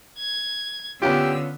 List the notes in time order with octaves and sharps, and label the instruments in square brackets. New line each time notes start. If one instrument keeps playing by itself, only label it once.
[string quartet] G#6
[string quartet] D3 E6 [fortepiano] B3 C#4 F4 [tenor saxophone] G4